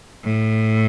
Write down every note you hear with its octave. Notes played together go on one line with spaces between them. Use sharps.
A2